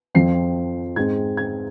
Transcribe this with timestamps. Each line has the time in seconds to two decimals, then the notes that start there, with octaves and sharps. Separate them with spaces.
0.15 F2 F3 C4 C7
0.96 G#2 G#3 C4 G#6
1.37 G#6